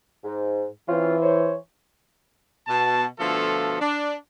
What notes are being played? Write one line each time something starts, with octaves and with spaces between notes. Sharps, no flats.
G#2
E3 C4 C#4 F4
C5 C#5
B2 A5
B2 D3 F3 A3 F4 A4
D4